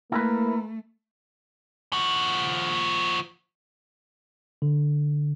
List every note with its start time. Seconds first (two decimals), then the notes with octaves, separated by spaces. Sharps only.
0.12 A3 A#3 E4 A#4 B4
1.93 F3 F#4
4.62 D3